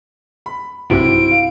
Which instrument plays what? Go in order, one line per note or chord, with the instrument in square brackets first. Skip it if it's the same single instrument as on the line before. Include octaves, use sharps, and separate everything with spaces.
[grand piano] B5
[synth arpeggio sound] B1 G2 C3 [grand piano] C4 E4 F#4 [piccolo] D7
[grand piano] F5